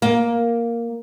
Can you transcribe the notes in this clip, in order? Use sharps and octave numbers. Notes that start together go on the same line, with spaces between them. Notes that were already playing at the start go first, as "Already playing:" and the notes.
A#3